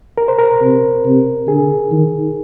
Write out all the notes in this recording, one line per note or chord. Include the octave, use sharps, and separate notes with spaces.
A#4
C5
A#4
C3
C3
D3 G#4
D#3